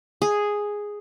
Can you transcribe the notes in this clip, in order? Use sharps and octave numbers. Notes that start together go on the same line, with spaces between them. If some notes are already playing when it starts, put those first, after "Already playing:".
G#4